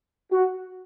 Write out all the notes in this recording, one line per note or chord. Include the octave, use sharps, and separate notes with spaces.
F#4